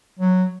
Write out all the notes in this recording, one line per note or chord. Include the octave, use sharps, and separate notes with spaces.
F#3